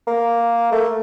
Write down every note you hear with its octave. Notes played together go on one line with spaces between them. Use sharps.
A#3
A3